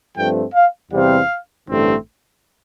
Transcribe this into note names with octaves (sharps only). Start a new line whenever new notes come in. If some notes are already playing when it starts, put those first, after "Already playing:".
G2 F3 A3 C4 G5
F5
E2 C3 G3 C4 F5
A1 G2 D3 A3 C4